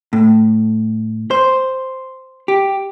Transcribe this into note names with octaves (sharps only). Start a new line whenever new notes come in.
A2
C5
G4